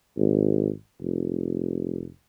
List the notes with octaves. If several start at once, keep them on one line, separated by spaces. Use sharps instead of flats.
G#1
F1